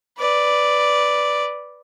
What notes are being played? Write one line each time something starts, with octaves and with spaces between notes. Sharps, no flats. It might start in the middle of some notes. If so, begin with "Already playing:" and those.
B4 D5